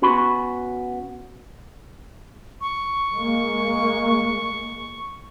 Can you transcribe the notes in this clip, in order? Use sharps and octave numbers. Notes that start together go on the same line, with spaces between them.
B3 C#4 F#4 B5
C#6
G#3 A#3